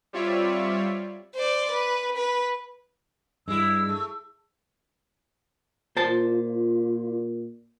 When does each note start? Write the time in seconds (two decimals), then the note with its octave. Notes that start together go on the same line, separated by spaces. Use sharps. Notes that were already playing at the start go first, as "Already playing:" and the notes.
0.13 G3 C4 F4 C#5 D5 E5
1.35 C5 D5
1.71 B4
2.17 B4
3.48 G2 G#3 E4 E6
3.89 A3
5.97 A#2 F4 C5 A5